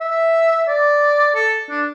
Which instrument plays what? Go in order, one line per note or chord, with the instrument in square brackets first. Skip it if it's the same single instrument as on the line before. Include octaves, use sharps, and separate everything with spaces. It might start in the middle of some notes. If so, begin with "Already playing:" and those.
[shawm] E5
D5
A4
D4